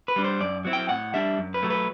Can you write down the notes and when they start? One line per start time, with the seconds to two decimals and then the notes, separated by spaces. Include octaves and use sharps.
0.08 B4
0.16 G3 D4
0.24 C5
0.40 F#2 D5
0.65 F#3 C4 E4
0.73 G5
0.89 A2 F#5
1.14 G3 D4 E5
1.38 F#2
1.54 B4
1.63 F#3 A3
1.70 B4